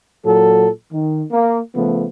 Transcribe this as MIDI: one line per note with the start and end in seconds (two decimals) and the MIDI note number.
0.25 0.67 46
0.25 0.67 54
0.25 0.67 69
0.92 1.22 51
1.30 1.58 58
1.73 2.05 49
1.73 2.05 53
1.73 2.05 57
1.73 2.05 59